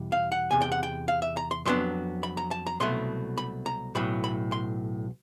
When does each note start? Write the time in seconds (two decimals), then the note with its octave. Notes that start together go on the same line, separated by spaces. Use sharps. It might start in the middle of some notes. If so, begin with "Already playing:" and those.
Already playing: E2 B2 G3
0.12 F5
0.32 F#5
0.51 E2 C3 G#5
0.62 G5
0.72 F#5
0.83 G5
1.08 F5
1.22 E5
1.37 A#5
1.51 C6
1.65 F2 C#3 F#3 B3 D4 C6
2.23 B5
2.37 A#5
2.51 A5
2.66 A#5
2.80 C2 B2 F#3 A3 C6
3.38 B5
3.66 A#5
3.95 B1 A2 F#3 B5
4.24 B5
4.52 C6